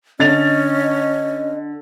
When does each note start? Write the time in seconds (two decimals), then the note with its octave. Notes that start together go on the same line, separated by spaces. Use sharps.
0.20 D3 C#4 D#5 A6 F7